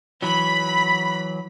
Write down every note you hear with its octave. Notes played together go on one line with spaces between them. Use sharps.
E3 F#3 B5